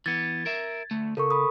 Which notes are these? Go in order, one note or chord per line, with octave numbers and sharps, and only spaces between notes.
E3 B3 G#6 A6
A#4 E5
D2 A3
C#3 A4 A#4 C#6
B5 D#6